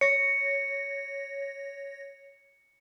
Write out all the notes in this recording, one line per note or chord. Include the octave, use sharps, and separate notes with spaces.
C#5 A#6 C#7